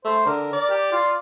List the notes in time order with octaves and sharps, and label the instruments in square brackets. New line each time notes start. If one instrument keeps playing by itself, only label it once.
[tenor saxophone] A3 [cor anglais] C5
[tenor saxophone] D3 [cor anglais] A#4
[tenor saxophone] D5
[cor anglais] G4
F4